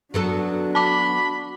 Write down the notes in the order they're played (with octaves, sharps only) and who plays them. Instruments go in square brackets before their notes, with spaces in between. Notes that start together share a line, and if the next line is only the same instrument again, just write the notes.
[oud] F#3 B3 A4 [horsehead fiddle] D4 F#4
[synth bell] A5 D6 [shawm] B5